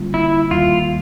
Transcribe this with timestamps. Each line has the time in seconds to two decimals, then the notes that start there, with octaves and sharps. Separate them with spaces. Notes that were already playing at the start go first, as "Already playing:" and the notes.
Already playing: D3 G3 A#3 C#4 F4
0.14 E4
0.51 D#2 D#3 G3 A#3 F4